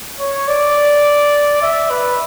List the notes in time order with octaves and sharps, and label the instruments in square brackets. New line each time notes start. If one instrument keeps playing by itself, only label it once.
[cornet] C#5
D5
E5
B4